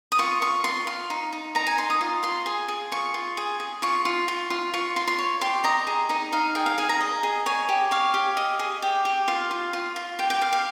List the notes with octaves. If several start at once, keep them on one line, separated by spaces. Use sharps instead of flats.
D#6
F4 C#6
F4 C#6
F4 C6
F4
D#4
D#4
D#4 A#5
G#5
D#4 C6
D#6
F4
F4 C6
G#4
G#4
F4 C#6
F4
G#4
G#4
F4 C#6
F4
F4
F4
F4 C#6
F4 C6
C6
C#5
G4 C6
D#5 A#5
G#4
D#4 D#5
D#4 F5
G#4 G5
F5
G#4 G#5
A#5
D#5
G#4
C#5 G#5
G4
C#5 F5
G4
D#5
G#4
G4
G4
F4 F5
F4
F4
F4
G4 G5
G5
G4 F5
F5